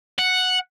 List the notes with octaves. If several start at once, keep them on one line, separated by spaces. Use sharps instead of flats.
F#5